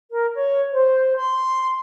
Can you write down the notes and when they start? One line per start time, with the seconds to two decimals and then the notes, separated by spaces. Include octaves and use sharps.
0.11 A#4
0.35 C#5
0.72 C5
1.17 C6